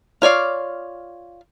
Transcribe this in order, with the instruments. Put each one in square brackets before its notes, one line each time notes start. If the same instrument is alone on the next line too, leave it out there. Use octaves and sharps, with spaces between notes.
[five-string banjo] F4 C#5 D5 F5